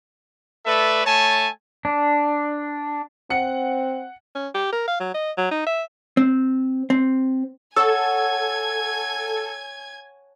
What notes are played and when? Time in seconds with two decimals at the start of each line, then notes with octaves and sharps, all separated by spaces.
0.65 A3 A4 B4 D5 E5
1.05 A3 C#5 G#5 A5
1.85 D4
3.30 C4 F#5 C#7
4.35 C#4
4.55 G4
4.72 A#4
4.87 F5
5.00 F#3
5.14 D#5
5.38 F#3
5.51 D#4
5.67 E5
6.17 C4
6.90 C4
7.76 A4 C#5 F#5 G#5 A5 E6 G#6